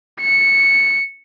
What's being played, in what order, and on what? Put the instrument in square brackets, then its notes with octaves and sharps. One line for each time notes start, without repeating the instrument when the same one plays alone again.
[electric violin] C#7